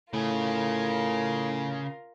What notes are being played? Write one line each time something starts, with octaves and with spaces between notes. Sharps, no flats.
A2 C#3 F4 G#4 A#4